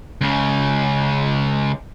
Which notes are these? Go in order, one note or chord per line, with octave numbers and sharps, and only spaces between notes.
C#2 C#3